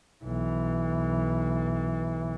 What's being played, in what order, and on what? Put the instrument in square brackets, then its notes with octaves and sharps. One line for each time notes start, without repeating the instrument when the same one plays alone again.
[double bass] B1 E3